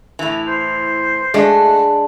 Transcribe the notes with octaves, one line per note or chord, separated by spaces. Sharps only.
A2 E3
C5
G#3 A3 D4 F#4